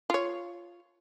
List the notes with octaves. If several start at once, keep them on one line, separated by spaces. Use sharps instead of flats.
F4 C#5